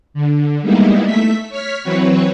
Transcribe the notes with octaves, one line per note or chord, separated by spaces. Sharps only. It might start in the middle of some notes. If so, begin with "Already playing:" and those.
D3
G3 G#3 A#3 B3 D#4 E4
A3 E5 B6
C#5 F6 B6
E3 F#3 C4 F#4 B4 C#5